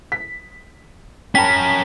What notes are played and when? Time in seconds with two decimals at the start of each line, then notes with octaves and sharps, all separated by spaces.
0.12 B6
1.35 C#4 A#4 G5 A5 B5 B6